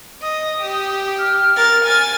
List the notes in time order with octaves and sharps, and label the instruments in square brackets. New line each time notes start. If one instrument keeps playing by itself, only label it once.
[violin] D#5 [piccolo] D#6
[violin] G4
[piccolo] F6
[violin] A#4 A6
G#5 A6